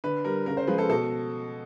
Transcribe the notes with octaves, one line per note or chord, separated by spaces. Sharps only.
D3 B4
G3 A#4
C#3 A#4
C5
F3 G#3 B4
A4
B2 A4